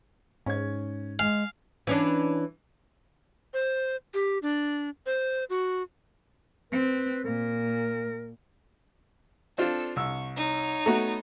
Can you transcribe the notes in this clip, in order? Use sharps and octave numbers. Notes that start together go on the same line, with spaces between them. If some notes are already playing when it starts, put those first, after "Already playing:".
G#2 C#4 G#6
G#3 F5 G#5
E3 C#4 D4
C5
G4
D4
C5
F#4
C4 B4
A#2 A#4
C4 D4 F4 A4
C2 C#6 E6
D#4 C#5
A3 B3 F#4 A#5